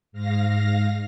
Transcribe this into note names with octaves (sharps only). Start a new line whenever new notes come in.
G#2 F5 A#6